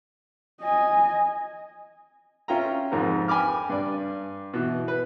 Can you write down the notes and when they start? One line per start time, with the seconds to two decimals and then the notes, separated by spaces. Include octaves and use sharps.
0.62 D#5 G#5
2.48 C#4 F4 E5 G5 A#5
2.92 F2 G#2 D#4 A#4
3.28 G5 G#5 B5 D6 F6
3.70 G2 D5
4.54 B2 E3
4.88 B4